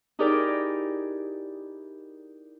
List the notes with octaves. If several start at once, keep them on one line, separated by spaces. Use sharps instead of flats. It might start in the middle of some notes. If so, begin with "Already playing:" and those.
D#4 E4 G4 G#4 A#4 D5